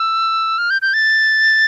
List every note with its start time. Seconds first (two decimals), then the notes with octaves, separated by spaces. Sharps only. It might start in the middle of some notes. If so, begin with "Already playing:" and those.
Already playing: E6
0.58 F6
0.70 G6
0.82 G6
0.94 A6